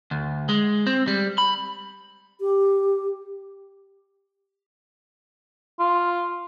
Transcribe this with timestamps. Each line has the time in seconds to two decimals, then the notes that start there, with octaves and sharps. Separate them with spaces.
0.11 D2
0.49 G#3
0.87 C4
1.08 G3
1.38 B5
2.39 G4
5.79 F4